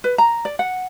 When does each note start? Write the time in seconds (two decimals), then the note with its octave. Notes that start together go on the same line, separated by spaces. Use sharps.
0.04 B4
0.18 A#5
0.45 D5
0.59 F#5